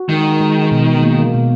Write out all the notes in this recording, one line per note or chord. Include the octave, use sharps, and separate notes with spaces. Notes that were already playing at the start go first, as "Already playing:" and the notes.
Already playing: F#4
D#3 G#3
G#3
B2
A#3
B2